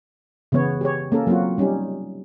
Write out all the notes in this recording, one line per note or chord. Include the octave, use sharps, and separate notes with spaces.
C#3 E3 B3 C#5
G4 G#4 C#5
A#3 C#4 A4 A#4
F#3 A#3 C4 F4 F#4
G3 C#4 D#4 G4